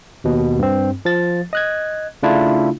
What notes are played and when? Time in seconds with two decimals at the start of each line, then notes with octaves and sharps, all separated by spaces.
0.24 D#2 B2
0.59 G2 C4
1.05 F3 A6
1.53 D#5 F#6 G#6
2.23 C#3 A3 D4 E4 F4